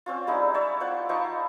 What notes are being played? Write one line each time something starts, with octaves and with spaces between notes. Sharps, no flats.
C4 C#4 F4
G3 G#3 D#4 E4
C#5 D5 E5
F4 C5 F#5
F3 D#4 E4 C#6